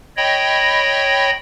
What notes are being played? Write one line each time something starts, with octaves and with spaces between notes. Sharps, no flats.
C#5 D#5 G5 B5